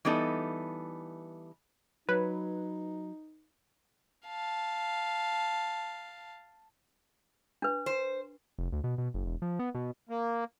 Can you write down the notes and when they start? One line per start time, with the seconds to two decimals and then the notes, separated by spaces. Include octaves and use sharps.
0.05 E3 G3 B3 D#4 A4
2.09 F#3 D#4 B4
4.27 F5 A5
7.62 D4 B4
7.86 C5
8.58 F1
8.72 D2
8.84 B2
8.98 B2
9.14 F#1
9.26 E1
9.42 F3
9.59 B3
9.75 B2
10.09 A#3